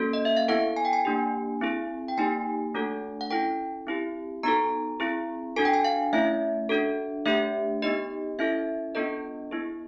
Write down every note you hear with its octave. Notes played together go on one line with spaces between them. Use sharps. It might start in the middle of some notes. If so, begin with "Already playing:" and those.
Already playing: A#3 C#4 F#4 A4
D#5
E5
F5
B3 E4 A4 F#5
G#5
G5
G#5
A#3 D4 G4
C4 E4 G#4
G5
A#3 D#4 G4 G#5
A3 D4 F#4 A4
F#5
C#4 E4 A4 G5
C4 E4 G4
B3 D#4 F#4 A4 A#5
C4 E4 G#4
D4 F#4 A4 G#5
G5
G#5
F5
A3 C#4 E4 E5
D4 F#4 A4
A3 D4 G4 E5
B3 D#4 G4 D#5
C#4 E4 A4 E5
B3 D4 F4 A4 D#5
B3 E4 G#4